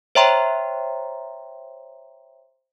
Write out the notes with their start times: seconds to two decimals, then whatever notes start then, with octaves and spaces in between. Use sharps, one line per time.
0.15 C5 C#5 E5 G5 A#5 C6